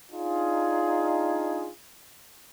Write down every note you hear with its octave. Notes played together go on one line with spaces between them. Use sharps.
D4 D#4 F4 G#4